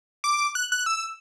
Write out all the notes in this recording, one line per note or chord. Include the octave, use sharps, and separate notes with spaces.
D6
F#6
F#6
E6